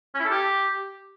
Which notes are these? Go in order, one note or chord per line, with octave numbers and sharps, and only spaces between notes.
C#4
E4
A4
G4